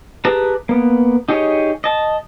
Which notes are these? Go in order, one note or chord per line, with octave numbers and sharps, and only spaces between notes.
G4 G#4 B4 A5 A#5
A#3 B3
D#4 G4 G#4 C#5 D#5
D#5 A5